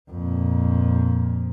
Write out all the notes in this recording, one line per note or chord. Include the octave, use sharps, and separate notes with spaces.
F2 A#2